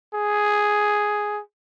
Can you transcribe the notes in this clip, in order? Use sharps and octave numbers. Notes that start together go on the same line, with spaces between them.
G#4